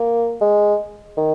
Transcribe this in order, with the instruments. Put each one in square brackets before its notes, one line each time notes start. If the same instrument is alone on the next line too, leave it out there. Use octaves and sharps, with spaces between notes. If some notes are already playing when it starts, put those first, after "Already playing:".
Already playing: [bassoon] A#3
G#3
D#3